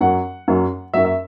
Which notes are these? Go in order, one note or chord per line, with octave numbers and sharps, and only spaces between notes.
F#2 F#3 F#5
F#2 F#3
F#2 F#3 E5
E5